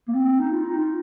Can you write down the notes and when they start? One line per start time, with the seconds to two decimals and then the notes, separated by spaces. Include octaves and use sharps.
0.08 A#3
0.14 C4
0.39 D#4
0.52 F4
0.64 D#4
0.78 F4